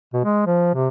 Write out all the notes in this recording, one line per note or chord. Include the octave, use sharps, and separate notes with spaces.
B2
G#3
F3
C3